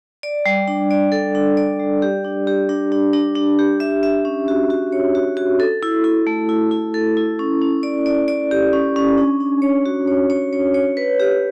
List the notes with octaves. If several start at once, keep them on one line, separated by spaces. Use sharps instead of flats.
D5
G3
D4
D5
A4
D4
D5
G3
G4
D4
G4
D4
D4
D4
D4
G4
E5
E5
C#4
F#4
F#4
C#5
F#4
F#4
A4
E4
E4
A3
E4
E4
A4
E4
C#4
C#4
D5
D5
D5
G4
C#4
C#4
D4
D4
C#5
F#4
C#5
C#5
C#5
C#5
B4
G4